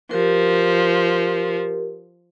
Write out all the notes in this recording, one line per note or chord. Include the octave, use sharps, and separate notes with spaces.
F3 G4 A#4